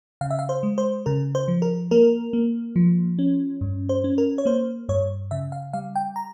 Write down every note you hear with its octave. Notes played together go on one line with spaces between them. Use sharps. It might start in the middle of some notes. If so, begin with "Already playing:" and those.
C#3 F5
E5
F5
C5
G#3
C5
C#3 A#4
C5
F3
A#4
A#3 A#4
A#3
F3
C#4
G2
C5
C#4
A#4
C#5
A#3 C5
G2 C#5
C#3 E5
F5
G3 F5
G5
A#5